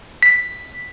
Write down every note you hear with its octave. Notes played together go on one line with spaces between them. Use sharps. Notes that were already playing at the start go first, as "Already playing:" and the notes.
B6